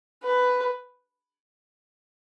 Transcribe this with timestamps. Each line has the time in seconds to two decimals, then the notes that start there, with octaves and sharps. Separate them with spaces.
0.24 B4